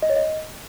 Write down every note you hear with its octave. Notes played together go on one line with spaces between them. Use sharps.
D#5
C#5
D#5